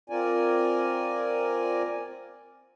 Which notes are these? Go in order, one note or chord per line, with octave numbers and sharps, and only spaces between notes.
C4 F4 A#4 D5 G#5